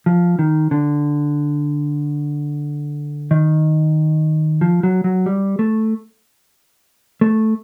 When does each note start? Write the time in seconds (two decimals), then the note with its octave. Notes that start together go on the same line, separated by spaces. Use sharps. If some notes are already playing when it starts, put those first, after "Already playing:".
0.06 F3
0.39 D#3
0.71 D3
3.31 D#3
4.61 F3
4.83 F#3
5.04 F#3
5.26 G3
5.59 A3
7.21 A3